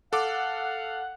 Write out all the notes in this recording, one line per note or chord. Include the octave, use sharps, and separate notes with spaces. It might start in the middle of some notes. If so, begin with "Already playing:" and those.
A4 F5 F#5 D6